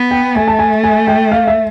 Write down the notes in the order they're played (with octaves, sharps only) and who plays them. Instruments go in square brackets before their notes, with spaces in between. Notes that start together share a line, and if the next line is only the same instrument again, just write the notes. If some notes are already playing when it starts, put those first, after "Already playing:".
Already playing: [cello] B3
[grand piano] G5
[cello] A3 [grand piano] G#5
[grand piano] A5
G#5
G#5
G5
F5
E5